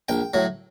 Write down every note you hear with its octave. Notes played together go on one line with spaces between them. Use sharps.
A#1 G5
A2 F#3